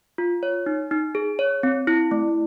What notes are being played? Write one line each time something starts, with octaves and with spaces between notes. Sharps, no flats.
F4
C#5
D#4
D#4
G#4
C#5
C4
E4
A3